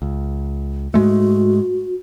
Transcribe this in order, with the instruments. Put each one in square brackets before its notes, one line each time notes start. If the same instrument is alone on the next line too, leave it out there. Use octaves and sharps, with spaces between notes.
[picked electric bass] C#2
[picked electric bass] G#2 G#3 A3 [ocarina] F#4